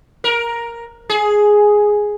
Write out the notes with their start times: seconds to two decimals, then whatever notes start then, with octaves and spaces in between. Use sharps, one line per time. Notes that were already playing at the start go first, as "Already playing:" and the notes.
0.24 A#4
1.09 G#4